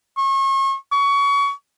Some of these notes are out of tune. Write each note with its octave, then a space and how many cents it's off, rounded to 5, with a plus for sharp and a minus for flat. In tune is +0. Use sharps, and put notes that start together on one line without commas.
C#6 -35
C#6 +25